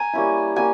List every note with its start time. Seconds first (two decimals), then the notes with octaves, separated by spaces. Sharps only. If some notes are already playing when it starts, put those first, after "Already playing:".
Already playing: G#5 A#5
0.13 G3 A#3 C#4 E4
0.56 G3 A#3 C#4 G#5